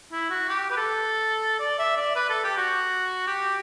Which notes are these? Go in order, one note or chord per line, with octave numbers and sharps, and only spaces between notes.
E4
F#4
G4
B4
A4
D5
E5
D5
B4
A4
G4
F#4
G4